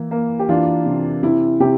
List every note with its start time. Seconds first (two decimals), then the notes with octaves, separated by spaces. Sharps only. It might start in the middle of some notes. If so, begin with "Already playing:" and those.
Already playing: E3 A#3
0.11 A#3
0.39 G4
0.49 E3 D4 F4
0.86 C3
1.23 C3 E4
1.60 C3 E4 G4